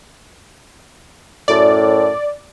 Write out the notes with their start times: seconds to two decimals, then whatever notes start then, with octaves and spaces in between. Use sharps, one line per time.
1.48 F#2 A2 D5